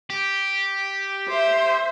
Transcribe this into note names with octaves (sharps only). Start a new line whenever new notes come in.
G4
C5 E5